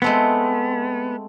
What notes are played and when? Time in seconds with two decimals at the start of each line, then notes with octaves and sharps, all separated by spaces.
0.02 G#3 A3 B3 C4